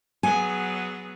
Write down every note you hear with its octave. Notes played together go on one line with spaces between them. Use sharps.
F#3 B3 G#4 G#5